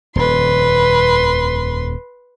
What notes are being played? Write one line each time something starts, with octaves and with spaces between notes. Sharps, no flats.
D#1 F2 B4 C6